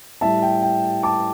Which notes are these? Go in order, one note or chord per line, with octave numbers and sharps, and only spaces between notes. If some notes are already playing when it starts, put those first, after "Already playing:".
A2 G3 E5 A5
G5
G5
A5 D6